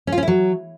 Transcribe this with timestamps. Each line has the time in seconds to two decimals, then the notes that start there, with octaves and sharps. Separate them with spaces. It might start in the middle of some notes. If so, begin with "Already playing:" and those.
0.07 C#4
0.12 F4
0.17 C#4
0.23 E4
0.28 F#3